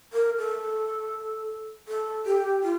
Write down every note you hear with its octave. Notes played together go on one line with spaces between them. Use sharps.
A#4
A4
A4
G4
F4